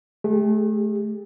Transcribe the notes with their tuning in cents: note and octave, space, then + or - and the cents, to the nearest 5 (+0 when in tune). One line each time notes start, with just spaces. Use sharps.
A3 -30 G4 +35